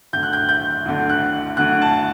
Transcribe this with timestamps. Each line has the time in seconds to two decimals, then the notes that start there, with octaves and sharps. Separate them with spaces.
0.13 D2 D3 G6
0.23 F#6
0.33 G6
0.49 G6
0.86 D2 D3
1.09 F#6
1.57 D2 D3 F#6
1.82 A5